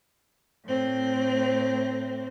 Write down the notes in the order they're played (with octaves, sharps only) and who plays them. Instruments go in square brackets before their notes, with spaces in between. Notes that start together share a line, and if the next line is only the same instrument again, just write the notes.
[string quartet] A2 C4